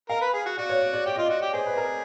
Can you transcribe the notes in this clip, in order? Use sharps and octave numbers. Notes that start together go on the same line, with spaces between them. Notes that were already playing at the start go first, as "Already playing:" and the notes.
A#4 F5
B4
G#4
F#4
F#4 D5
C#5
D5
D5
G4 D5
F4 D#5
D5
F#4
G4
G#4 C5
B4
A#4